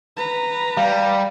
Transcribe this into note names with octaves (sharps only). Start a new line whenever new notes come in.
B4 A#5
G3 F5